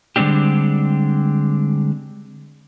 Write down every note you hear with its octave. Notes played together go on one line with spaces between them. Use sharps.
D3 G3 G#3 C4 D4 G4